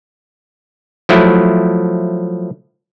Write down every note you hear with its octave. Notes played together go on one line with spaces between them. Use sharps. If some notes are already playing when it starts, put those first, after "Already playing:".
F3 F#3 A3 E4